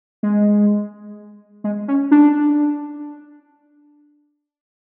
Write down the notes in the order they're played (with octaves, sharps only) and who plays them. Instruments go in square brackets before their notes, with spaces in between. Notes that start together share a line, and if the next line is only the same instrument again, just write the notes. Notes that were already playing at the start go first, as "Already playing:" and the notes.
[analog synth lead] G#3
G#3
C#4
D4